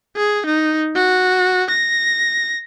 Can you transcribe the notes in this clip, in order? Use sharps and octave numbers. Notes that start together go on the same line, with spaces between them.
G#4
D#4
F#4
A#6